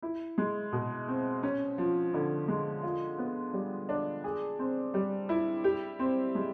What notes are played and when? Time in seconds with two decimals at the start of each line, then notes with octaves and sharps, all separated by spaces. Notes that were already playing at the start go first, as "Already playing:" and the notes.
0.02 E4
0.38 G#3
0.72 B2
1.08 C4
1.43 C#4
1.78 F3
2.14 D3
2.48 G#3
2.83 F4
3.18 B3
3.53 G3
3.89 D4
4.24 G#4
4.59 C4
4.94 G3
5.29 E4
5.64 G4
5.99 C4
6.35 G#3